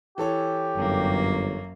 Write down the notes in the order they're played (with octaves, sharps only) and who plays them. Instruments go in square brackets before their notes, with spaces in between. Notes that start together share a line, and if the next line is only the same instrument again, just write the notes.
[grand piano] E3 A4 C#5 [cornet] G4
[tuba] G1 [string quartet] F#2 A#3